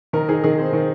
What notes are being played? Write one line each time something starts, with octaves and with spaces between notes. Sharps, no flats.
D#3 A#4
D#4 G#4
D#3 G#4
C4 C5
D#3